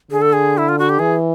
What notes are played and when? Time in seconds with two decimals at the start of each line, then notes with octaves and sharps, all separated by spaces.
0.11 D3 G#4
0.22 A4
0.33 G#4
0.58 E4
0.69 F4
0.79 F#4
0.89 G4
0.99 E3 G#4